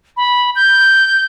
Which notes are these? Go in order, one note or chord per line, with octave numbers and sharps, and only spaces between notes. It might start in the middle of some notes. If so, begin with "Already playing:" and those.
B5
G6